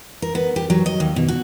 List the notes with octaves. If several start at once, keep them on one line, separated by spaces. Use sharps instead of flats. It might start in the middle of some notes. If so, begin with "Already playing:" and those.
A#4
B3
G4
F#3
D#5
D#2
B2
F#4